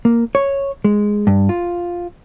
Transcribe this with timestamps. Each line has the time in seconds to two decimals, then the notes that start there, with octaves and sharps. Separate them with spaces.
0.05 A#3
0.35 C#5
0.84 G#3
1.27 G2
1.49 F4